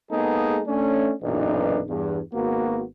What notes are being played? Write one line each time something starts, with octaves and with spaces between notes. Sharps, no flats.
G#3 A#3 B3 D#4 G#4 A4
A3 C#4 D4
B1 F#2 A#2 E3 D4 D#4
E2 G2
G#1 A#3 B3 F#4